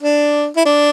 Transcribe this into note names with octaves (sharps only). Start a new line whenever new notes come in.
D4
E4
D4